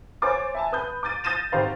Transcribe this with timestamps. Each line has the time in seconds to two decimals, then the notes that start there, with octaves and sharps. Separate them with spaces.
0.22 C5 C#5 G#5 D6 A6
0.54 E5 G#5 A5
0.72 B4 D#6 G6
1.03 D6 G6 A6 D#7
1.24 D#6 G6 A6 A#6 D#7 E7
1.52 G#1 G4 C5 F5